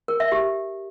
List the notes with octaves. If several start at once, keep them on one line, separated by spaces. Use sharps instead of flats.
A#4
E5
G4